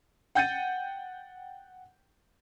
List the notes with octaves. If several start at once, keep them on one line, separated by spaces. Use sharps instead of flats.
F#5 G5 G6 A6 C#7 D#7